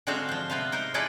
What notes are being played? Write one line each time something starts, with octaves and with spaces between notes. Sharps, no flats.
D3 G#3 C4 F#4 E5 F5
F3 C5
C3 B3 B4 C5 F5
D#4 A#4 C5
D#4 E4 G#4 A4 B4 D5